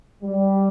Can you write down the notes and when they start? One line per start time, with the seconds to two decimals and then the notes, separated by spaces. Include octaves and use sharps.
0.22 G3